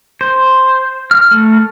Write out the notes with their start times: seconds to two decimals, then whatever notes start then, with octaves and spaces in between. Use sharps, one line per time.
0.21 C5
1.11 F6
1.31 A3